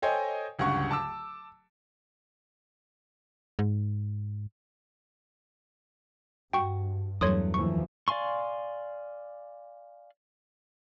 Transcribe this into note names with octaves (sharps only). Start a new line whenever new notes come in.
A4 C5 C#5 D#5 G5 G#5
D1 C#2 G2 F#5 C#6
A5 D6 E6
G#2
G2 F#4 G5 C#6
E2 G2 F#3 A3 C#5 C6 D#6
D#2 E3 F3 C#6
D5 F5 G#5 C6 C#6